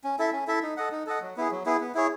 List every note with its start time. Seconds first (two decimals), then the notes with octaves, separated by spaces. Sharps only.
0.04 C#4
0.19 E4 A4 E5
0.32 C#4
0.47 E4 A4 E5
0.62 D#4
0.77 A4 D#5 F#5
0.92 D#4
1.07 A4 D#5 F#5
1.22 F#3
1.37 B3 E4 G#4
1.51 F#3
1.66 B3 E4 G#4
1.80 B3
1.95 E4 G#4 C#5